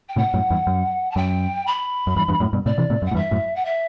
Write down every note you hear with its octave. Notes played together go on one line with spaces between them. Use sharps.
G5
A2 C3 F#5
F#2 A2
E2 G2
F#2
A5
F#2 G5
B5
F#2
E2 G2
E2 G2
F#2 A2
G2 B2
A2 C3 D5
C3 E3
A2 C3
F#2
F#5
A2
E2 G2 E5
F#2 A2
F#5
E5